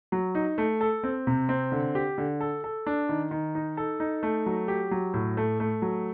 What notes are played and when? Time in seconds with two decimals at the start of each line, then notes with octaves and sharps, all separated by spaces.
0.12 F#3
0.35 D#4
0.58 A3
0.81 A4
1.03 C4
1.27 C3
1.49 C4
1.72 D3
1.95 G4
2.18 D3
2.40 A4
2.64 A4
2.87 D4
3.09 D#3
3.31 D#3
3.55 D#4
3.77 A4
4.00 D#4
4.23 A3
4.46 F#3
4.68 G4
4.91 F#3
5.14 A2
5.37 A3
5.60 A3
5.82 F#3